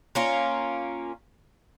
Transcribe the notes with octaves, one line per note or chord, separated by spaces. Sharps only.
A#3 C#4 F4